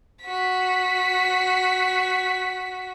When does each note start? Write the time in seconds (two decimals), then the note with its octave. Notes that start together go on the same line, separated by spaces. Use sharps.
0.25 F#4 B6